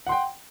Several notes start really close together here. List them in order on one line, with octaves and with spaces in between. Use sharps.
F#5 C6 G5